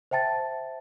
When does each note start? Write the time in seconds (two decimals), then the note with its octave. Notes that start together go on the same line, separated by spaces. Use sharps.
0.11 C5 E5 G5 A5 A6